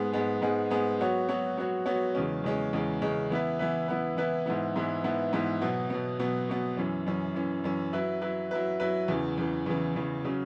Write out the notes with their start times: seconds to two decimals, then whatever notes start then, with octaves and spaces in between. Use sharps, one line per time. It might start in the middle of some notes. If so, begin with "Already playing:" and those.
Already playing: G#2 G#3 B3 G#4
0.12 G#2 G#3 B3 G#4
0.42 G#2 G#3 B3 G#4
0.70 G#2 G#3 B3 G#4
0.99 F#3 B3 F#4 C#5
1.29 F#3 B3 F#4 C#5
1.57 F#3 B3 F#4 C#5
1.86 F#3 B3 F#4 C#5
2.15 E2 C#3 G#3 C#4
2.44 E2 C#3 G#3 C#4
2.73 E2 C#3 G#3 C#4
3.02 E2 C#3 G#3 C#4
3.30 E3 B3 E4 B4
3.59 E3 B3 E4 B4
3.88 E3 B3 E4 B4
4.17 E3 B3 E4 B4
4.46 G#2 E3 B3 E4
4.76 G#2 E3 B3 E4
5.04 G#2 E3 B3 E4
5.33 G#2 E3 B3 E4
5.62 B2 F#3 B3
5.90 B2 F#3 B3
6.19 B2 F#3 B3
6.49 B2 F#3 B3
6.77 F#2 E3 C#4
7.06 F#2 E3 C#4
7.35 F#2 E3 C#4
7.64 F#2 E3 C#4
7.93 F#3 E4 B4
8.21 F#3 E4 B4
8.51 F#3 E4 B4
8.80 F#3 E4 B4
9.08 E2 C#3 E3
9.38 E2 C#3 E3
9.66 E2 C#3 E3
9.96 E2 C#3 E3
10.24 C#3 F#3 C#4